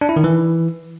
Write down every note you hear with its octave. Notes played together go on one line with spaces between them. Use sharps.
D4
E4
D#3
E3